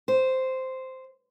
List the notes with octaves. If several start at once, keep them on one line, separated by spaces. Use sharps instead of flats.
C5